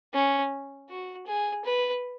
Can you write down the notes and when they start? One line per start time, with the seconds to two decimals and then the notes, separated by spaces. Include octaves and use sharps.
0.14 C#4
0.89 F#4
1.27 G#4
1.65 B4